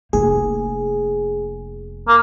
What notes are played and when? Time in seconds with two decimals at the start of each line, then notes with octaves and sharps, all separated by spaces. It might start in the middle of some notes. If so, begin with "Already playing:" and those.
0.13 F1 A#3 G#4
2.08 A#3